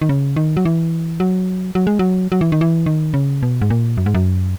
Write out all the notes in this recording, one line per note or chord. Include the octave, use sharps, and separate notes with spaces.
D#3
C#3
D#3
F#3
E3
F#3
F#3
G#3
F#3
F#3
E3
D#3
E3
D#3
C#3
B2
G#2
A#2
F#2
G#2
F#2